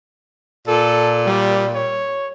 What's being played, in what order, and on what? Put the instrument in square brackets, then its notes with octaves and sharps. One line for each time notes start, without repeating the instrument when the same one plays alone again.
[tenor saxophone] A#2 [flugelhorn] A4
[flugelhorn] G3
C#5